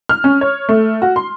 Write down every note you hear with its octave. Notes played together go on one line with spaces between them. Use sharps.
F6
C#4
C#5
A3
F#4
C6